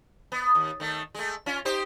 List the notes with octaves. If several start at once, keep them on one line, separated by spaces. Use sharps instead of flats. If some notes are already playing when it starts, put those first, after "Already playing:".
B3
D#2
D#3 A3
G#3 A3
C#4 F4
D#4 G4 C5